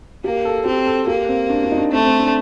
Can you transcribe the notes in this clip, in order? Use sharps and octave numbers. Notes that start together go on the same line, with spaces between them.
A#3 G4
A4
C4 G4
A4
A#3 G4
C4
D4
D4
D#4
D4
A3 C4
C4
D4